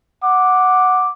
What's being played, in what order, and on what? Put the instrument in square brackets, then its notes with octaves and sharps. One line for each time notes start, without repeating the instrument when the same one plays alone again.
[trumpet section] F#5 D6